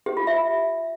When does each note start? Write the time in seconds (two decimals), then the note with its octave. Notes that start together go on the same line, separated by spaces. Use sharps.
0.06 G4
0.17 F4
0.27 E5